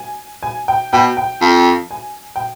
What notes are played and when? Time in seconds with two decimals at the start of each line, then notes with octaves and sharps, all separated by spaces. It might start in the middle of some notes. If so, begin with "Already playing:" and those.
Already playing: G#5
0.43 G#5
0.68 G5
0.93 B2 G5
1.17 G5
1.41 F2
1.91 G#5
2.36 G5